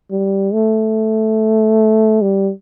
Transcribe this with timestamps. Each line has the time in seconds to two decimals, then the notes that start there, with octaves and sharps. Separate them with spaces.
0.11 G3
0.53 A3
2.22 G3